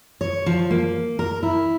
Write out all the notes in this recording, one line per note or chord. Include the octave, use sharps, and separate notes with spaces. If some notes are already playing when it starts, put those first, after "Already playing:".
C#5
F3
A#3
A#4
E4